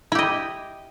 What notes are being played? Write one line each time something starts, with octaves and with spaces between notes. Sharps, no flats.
E4 G4 D#5